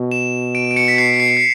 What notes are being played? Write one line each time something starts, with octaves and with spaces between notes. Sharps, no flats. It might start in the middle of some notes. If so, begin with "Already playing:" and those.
Already playing: B2
E7
D7
D7
C#7
B6
C7
C7
C7